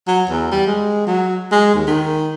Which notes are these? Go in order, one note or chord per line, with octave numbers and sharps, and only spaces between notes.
F#3
E2
G3
G#3
F#3
G#3
D#2
D#3